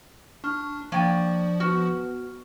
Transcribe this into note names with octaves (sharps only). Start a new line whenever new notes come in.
D4 C#6 F6
F3 A#3 D4 G5 C#6 A6 D#7
B3 F#4 F6